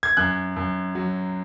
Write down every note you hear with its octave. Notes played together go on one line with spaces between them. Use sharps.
G#6
F#2 F#6
F#2
F#3